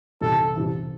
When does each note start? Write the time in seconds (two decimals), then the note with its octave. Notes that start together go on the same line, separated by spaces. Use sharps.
0.21 C2 C3 E3 A4
0.55 C2 C3 E3